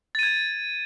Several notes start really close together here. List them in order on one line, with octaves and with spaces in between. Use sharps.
A6 D#7 G#6